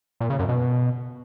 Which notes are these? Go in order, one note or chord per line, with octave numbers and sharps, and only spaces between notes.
A#2
C#3
F#2
B2